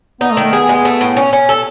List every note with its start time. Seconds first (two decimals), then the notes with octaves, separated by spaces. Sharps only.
0.21 B3 D#4
0.32 A3
0.37 D#3
0.43 A3
0.53 B3 G#4
0.69 G#3
0.85 A3
1.01 A2
1.17 C#4
1.33 C#4
1.49 A4